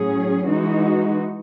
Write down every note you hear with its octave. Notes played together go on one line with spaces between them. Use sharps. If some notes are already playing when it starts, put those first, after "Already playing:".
Already playing: A2 F#3 C#4 G#4
E3 G#3 D#4 F#4